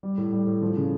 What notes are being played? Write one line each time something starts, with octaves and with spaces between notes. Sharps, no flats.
G3
A2
G3
A2
F3
C#3